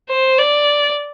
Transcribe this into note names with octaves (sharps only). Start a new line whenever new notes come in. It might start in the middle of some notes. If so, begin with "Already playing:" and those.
C5
D5